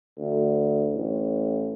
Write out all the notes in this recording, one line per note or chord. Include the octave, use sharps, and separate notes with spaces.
D2
A1